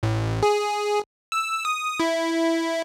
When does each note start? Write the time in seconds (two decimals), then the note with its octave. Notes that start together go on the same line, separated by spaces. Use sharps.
0.03 A1
0.43 G#4
1.32 E6
1.65 D#6
2.00 E4